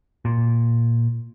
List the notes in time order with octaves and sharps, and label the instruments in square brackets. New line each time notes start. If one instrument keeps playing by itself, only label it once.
[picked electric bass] A#2